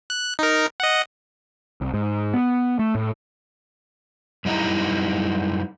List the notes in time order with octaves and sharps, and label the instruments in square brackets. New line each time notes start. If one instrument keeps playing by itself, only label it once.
[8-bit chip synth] F#6
D#4 A#4
D#5 F#5
[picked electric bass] C2
G#2
B3
A3
A2
[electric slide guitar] F#2 G3 D#4 E4 A#5